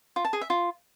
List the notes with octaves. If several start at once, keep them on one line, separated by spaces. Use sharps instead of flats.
F4
A5
G#4
E5
F4